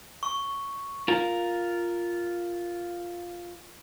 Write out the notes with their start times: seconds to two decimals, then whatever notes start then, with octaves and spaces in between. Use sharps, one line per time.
0.23 C#6
1.08 F4 A#4